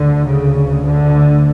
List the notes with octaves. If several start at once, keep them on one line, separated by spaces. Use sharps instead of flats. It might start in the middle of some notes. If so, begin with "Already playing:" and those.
Already playing: D2 D3
C#3
D3